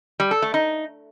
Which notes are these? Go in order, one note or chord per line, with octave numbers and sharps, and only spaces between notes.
G3
A4
A3
D#4